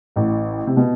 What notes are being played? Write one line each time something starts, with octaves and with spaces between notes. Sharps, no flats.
A1 A2
C3
B2